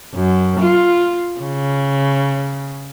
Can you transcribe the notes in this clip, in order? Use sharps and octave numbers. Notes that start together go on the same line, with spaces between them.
F#2
F4
C#3